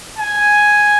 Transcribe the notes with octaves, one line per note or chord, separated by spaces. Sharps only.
G#5